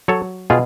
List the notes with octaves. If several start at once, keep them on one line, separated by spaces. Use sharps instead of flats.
F#3 A4 C#5
B2 F4 G#4